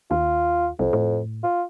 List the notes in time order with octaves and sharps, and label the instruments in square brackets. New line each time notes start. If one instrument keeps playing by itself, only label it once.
[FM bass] D#2 [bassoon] F4
[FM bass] C2 [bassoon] F2
[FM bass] A2
[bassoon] F4